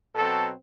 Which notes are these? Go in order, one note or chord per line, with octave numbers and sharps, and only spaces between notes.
B2 F#3 C4 A4